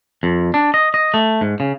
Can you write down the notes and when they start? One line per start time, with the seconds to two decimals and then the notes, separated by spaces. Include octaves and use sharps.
0.23 F2
0.54 D4
0.74 D#5
0.94 D#5
1.14 A3
1.41 G#2
1.60 C#3